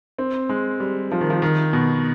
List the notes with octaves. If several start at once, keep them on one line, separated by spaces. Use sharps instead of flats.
C4
G#3
G3
F3
D#3
F3
D#3
B2